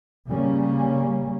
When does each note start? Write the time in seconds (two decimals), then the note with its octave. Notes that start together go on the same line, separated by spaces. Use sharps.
0.28 C#3 G3 A#3 C#4